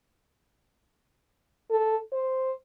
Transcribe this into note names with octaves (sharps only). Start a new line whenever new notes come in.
A4
C5